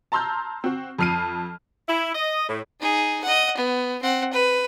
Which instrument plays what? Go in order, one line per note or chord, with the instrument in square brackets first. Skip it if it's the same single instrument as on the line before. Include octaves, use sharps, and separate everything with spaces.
[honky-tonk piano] A5 A#5 C6 E6 F6 G6
C4 F#4
F2 F3 F6 C7 D#7
[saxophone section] E4
D#5
A2
[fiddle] D#4 G#4
D#5 F#5
B3
C4 F#5
B4